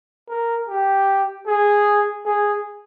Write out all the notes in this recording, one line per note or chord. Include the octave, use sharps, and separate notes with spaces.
A#4
G4
G#4
G#4